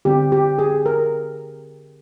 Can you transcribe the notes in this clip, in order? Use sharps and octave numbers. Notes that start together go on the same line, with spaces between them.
D3 G3 C4 G4
G4
G#4
A#4